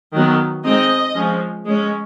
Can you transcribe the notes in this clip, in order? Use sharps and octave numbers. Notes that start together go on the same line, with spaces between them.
D#3 F#3 B3
G#3 C4 D#4 D#5
F3 G#3 C#4
G#3 C#4